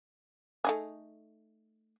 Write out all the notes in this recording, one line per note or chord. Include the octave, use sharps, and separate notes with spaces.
A3 D#4 G#4